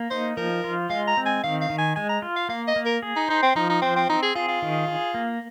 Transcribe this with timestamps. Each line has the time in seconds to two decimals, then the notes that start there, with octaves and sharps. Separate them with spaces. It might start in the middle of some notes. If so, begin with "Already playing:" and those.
Already playing: A#3
0.10 D#4 C5
0.37 F3 A#4
0.64 F4
0.90 G#3 F5
1.07 A#5
1.17 C4
1.26 G#5
1.44 D#3 F5
1.61 F5
1.70 D#3
1.78 G#5
1.96 G#3 G#5
2.09 A#5
2.22 F4
2.36 F5
2.49 A#3 F5
2.67 D#5
2.76 A#3
2.85 A#4
3.03 G#4
3.16 D#4
3.28 D#4 C5
3.42 C4
3.55 F3 D#4
3.69 D#4
3.82 C4 C5
3.96 C4
4.09 C4 D#4
4.23 G#4
4.35 F4 G#4
4.48 F4
4.62 D#3
4.88 G#4
5.14 A#3